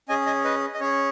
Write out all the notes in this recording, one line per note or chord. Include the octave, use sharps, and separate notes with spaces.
C#4 G#4 D#5 G#5
D#5 G#5
B4 D#5
D#5
C#4 G#4 C#5